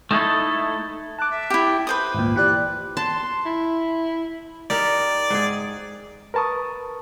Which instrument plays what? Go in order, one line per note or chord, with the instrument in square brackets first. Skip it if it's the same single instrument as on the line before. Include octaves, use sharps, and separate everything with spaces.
[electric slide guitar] A3 D#4 E4 A4
[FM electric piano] A5 D6 [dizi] F#6
[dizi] E5
[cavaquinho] E4 G4
[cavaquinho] B4 C5 D#6 [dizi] G5
[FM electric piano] G#1 D2 A#2
[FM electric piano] E3 G4 D5 [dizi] F#6
[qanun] A5 [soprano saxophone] C6
[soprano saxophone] E4
[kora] D#4 G4 A#4 [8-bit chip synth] D5
[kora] G#2 G#4
[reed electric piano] A#4 B4 A5 C#6 D#6